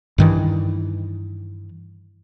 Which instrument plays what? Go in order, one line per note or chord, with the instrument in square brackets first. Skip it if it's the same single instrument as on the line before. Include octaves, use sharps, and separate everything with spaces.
[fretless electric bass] G2 D#3 E3